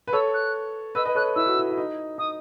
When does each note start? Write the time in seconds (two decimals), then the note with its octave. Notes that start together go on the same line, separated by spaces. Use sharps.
0.07 B4
0.13 A4 C#5 E6
0.34 F#6
0.95 B4 D#5 E6
1.05 B4 D#5
1.15 A4 C#5 F#6
1.36 E4 E6
1.46 F#4
1.57 E4
1.70 E4
1.77 D#4
2.18 D#4 D#6